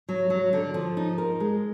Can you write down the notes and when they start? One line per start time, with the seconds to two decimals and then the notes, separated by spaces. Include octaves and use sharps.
0.09 F#3
0.30 F#3
0.53 D3
0.74 F3
0.97 D#4
1.18 A#4
1.40 G#3